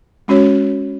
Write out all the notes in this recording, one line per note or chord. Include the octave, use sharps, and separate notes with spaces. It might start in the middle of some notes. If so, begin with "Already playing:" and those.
G#3 C#4 F#4 C#5